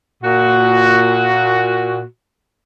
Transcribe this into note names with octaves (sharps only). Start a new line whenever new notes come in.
A#2 F#4